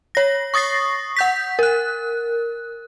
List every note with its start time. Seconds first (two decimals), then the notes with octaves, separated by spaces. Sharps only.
0.15 C#5 A#6
0.54 C#6 D#6 A6 A#6 C7
1.16 F#5 G6 B6
1.59 A#4 F#6